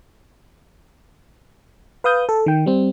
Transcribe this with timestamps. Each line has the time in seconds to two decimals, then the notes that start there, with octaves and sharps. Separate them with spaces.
2.04 B4 F5 D#6 G6
2.29 A4
2.46 D#3 G5
2.66 G3 C4